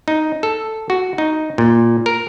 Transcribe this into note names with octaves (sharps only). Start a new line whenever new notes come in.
D#4
A4
F#4
D#4
A#2
A#4